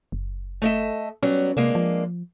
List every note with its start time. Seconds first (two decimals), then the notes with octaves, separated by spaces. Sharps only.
0.12 F#1
0.62 A3 D#5 E5
1.23 F#3 G3 B3 C#4
1.57 C3 G#3 A#3 D4
1.75 F3